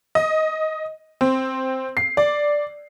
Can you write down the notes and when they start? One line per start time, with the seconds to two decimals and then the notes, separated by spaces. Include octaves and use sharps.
0.15 D#5
1.21 C4
1.97 C7
2.17 D5